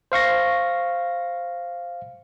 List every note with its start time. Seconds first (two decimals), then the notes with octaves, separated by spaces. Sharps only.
0.12 C5 F5 C#6 A#6